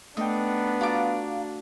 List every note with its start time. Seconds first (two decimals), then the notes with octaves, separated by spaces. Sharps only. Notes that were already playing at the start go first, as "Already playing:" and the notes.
0.17 A3 B3 D4 D#4 G5
0.81 F4 F#4 A#5 D6